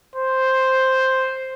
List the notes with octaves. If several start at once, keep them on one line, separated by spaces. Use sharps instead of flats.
C5